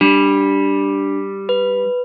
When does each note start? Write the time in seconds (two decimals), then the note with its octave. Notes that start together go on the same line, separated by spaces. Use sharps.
0.01 G3 D4
1.49 B4